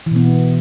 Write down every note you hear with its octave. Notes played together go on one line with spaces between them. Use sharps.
B2 E3 B3